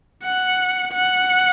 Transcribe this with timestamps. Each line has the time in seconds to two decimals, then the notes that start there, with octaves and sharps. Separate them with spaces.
0.24 F#5
0.93 F#5